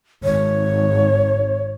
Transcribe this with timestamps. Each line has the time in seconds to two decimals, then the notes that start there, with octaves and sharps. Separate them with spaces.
0.24 G#1 C#5